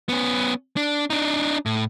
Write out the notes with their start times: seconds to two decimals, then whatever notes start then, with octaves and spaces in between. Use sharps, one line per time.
0.09 B3 C#4
0.76 D4
1.10 D4 D#4
1.66 A2